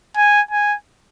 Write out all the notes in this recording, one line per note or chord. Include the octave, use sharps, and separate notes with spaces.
G#5
G#5